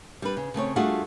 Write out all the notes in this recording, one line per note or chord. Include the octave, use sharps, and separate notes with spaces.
G3 D4 B4
C#3
C#3 A3 C4 C#5
G3 A3 D4 F4 F#4 G#4